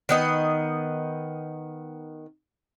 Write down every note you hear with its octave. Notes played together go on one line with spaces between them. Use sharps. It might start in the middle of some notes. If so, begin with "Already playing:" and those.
D#3 B3 D#5